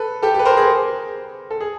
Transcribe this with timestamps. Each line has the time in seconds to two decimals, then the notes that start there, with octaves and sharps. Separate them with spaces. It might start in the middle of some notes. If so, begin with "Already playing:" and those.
Already playing: A4 B4
0.22 G4 A4
0.34 G4
0.39 B4
0.45 A#4 C5
0.57 G#4 A#4
1.51 A4
1.61 G#4